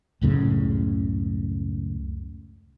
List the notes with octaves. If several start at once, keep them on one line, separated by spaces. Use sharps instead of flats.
C#2 F#2 A2 C#3